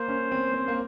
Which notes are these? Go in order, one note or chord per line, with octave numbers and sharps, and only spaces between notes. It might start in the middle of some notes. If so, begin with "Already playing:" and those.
Already playing: A#3 C5
C#4
C4
C4
A#3